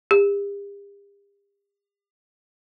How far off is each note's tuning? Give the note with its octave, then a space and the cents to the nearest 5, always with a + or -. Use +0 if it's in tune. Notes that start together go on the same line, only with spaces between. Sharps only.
G4 +45